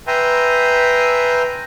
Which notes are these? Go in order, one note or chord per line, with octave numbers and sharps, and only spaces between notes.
B4 E5 G5 G#5 A#5 C6